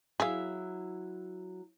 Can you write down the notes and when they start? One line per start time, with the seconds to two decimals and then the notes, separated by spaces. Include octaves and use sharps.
0.20 F#3 E4 G#4 E5 F5